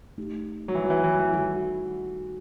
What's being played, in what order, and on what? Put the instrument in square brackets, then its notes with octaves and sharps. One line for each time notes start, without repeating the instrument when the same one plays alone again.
[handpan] A3 D#4 G4
[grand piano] F#3
E3
F#3
E3
E3
E3
[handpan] D#3 G3 D#4 F#4 A4